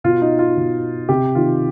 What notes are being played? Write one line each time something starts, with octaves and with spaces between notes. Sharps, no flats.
B2 F4
D#4
F4
B2
C3 G4
D#3 F4